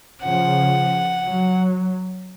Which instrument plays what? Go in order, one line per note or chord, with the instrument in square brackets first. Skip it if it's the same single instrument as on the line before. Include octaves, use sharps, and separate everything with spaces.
[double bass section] C#3 F3 [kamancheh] F#5
[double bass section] F#3